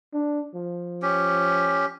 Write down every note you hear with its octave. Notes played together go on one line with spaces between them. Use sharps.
D4
F3
C#4 G4